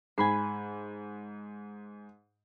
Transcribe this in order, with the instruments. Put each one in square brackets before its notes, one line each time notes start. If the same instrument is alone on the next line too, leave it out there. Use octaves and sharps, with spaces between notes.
[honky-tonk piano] G#2 [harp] G#5 B5 C7